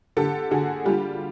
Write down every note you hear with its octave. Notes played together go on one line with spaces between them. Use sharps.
D3 G4 A4
D3 F#4 G#4
G3 F4 G4